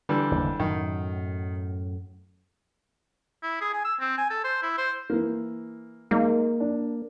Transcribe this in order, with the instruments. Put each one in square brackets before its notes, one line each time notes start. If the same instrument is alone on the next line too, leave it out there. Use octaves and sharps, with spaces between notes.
[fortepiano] D3 E3 G3
[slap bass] F#1 D#2
[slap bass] F#2 A2 F#3 [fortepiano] D#3
[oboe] E4
G#4
G#5
E6
C4
G#5
A4
C5
E4
C5
[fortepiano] E3 A#3
[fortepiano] G#3 D#4 [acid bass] A#3
[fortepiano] D4